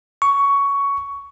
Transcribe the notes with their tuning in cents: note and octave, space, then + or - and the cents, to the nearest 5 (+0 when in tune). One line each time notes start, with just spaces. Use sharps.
C#6 +15